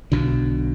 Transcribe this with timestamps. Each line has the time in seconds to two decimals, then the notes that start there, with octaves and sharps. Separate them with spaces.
0.12 B1 B2 D3